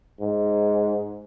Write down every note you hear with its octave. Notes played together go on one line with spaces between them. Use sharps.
G#2